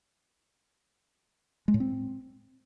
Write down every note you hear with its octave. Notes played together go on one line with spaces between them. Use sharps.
G#3
A2
C4